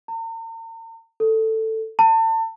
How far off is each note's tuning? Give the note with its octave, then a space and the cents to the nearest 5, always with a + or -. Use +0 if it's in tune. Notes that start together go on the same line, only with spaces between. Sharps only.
A#5 -45
A4 +10
A5 +35